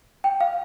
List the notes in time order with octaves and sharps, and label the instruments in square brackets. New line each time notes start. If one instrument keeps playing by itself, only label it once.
[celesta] G5
F5